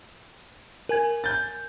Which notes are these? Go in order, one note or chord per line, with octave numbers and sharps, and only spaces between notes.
A#4 G#5 G#6
G6 A6